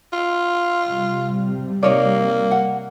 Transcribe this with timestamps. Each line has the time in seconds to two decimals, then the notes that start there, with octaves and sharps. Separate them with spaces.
0.13 F4
0.86 C3 G3
1.83 A#3 D#4 C#5 D5
2.51 F#5